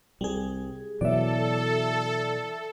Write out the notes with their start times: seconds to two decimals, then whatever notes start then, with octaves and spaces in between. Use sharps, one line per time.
0.21 C2 G3 G#4
1.01 B2 E3 F#3 A4 D5 E5